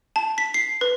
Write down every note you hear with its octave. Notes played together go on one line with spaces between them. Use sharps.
A5
B6
C7
B4